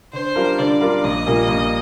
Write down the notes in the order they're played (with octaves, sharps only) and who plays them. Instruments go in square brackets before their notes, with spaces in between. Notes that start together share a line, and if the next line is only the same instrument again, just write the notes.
[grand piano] D3 [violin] C5
[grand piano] G3 D4 F4 A#4
[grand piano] D3 [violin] D5
[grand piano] G3 D4 F4 A#4
[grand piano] A#1 [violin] D#5
[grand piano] A#2 G3 A#3
A#1